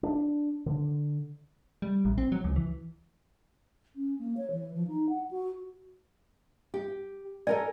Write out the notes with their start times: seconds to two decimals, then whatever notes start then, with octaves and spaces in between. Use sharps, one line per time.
0.03 D4
0.66 D3
1.82 G3
2.05 A1
2.18 C4
2.32 F#3
2.44 C#2
2.56 E3
3.96 C#4
4.19 A#3
4.37 C#5
4.51 E3
4.75 F3
4.87 D#4
5.09 F#5
5.31 F#4
6.74 G4
7.47 A4 A#4 D5 G#5